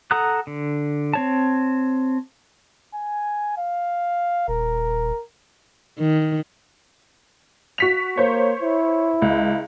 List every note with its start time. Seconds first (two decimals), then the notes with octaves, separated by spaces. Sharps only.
0.11 A4 F#5 A#5 D#6 F#6
0.47 D3
1.13 C4 C#5 A5
2.94 G#5
3.57 F5
4.48 D#1 A#4
5.99 D#3
7.78 F#4 B6 F7
8.17 A#3 C5 C#5
8.62 E4
9.22 C#2